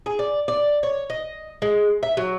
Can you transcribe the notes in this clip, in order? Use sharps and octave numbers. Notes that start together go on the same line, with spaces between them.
G#4
D5
D5
C#5
D#5
G#3
E5
F#3